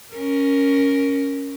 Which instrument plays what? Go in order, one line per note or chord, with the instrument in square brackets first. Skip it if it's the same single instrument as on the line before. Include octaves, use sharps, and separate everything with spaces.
[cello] C#4 A#4